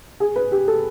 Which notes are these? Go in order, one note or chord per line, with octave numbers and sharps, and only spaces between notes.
G#4
B4
G4
A4